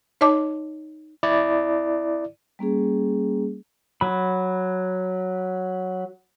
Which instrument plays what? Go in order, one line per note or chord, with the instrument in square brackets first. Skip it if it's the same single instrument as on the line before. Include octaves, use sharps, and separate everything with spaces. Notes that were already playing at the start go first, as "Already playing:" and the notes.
[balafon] D#4 C#5 D#5 A5 D6
[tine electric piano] E4 D5
[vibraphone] G3 A#3 C#4 G#4
[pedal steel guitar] F#3 B5